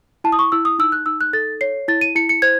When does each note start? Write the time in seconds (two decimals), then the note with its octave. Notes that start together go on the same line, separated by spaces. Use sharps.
0.24 E4 A5
0.32 D#6
0.39 C#6
0.52 E4 E6
0.65 D#6
0.79 D#4 E6
0.92 F#6
1.06 D#4 E6
1.21 F#6
1.33 A4 A6
1.61 C#5 C7
1.88 E4 A6
2.01 D#7
2.16 E4 C#7
2.29 C#7
2.42 C5 G#6